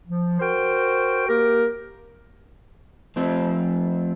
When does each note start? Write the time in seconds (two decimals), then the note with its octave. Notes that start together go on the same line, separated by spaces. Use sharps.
0.07 F3
0.40 F#4 A#4 C5 G5
1.28 A#3 G4 A#4
3.16 F2 F3 A3 C4